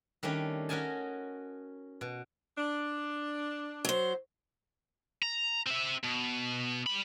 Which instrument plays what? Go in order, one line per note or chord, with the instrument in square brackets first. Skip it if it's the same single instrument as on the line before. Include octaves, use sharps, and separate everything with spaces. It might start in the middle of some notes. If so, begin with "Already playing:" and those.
[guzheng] D#3 G3 A3 C#4 D4
C#4 F#4 A#4 D#5 G#5 A5
B2
[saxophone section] D4
[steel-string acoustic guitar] F#3 C5
[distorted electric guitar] A#5
C4 E5
B2
G3 B5